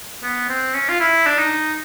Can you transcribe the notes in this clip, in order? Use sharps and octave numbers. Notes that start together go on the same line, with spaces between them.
B3
C4
C#4
F4
E4
D4
D#4